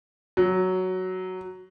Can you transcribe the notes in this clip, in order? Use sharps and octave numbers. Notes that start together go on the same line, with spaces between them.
F#3